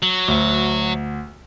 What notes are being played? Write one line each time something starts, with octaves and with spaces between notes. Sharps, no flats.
F#3 F#7
D2